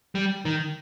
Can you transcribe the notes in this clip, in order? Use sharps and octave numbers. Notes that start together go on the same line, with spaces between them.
G3
D#3